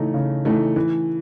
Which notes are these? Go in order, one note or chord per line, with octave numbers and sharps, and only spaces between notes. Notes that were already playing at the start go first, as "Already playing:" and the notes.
Already playing: C#3 E3 A3 D#4
C#3
E3 A3 D#4
E3